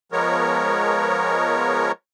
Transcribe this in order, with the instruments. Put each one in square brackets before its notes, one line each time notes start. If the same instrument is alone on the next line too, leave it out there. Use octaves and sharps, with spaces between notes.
[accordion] F3 G#3 B3 A#4 C#5